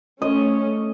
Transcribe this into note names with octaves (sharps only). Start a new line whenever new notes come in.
A3 C#4 D#5